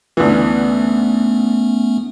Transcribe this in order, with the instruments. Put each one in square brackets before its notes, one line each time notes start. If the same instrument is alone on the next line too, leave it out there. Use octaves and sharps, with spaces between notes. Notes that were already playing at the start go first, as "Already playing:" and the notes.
[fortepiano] D2 E3 [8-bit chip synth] A3 B3 C#4